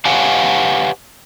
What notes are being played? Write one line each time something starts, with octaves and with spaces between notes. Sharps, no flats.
G4 B4 C#5 F5 F#5 G#5